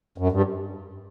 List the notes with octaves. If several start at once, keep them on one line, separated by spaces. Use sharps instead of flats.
F#2
G2